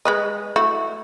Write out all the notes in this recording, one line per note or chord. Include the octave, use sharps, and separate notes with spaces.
G#3 B4 D#5
A3 E4 F#4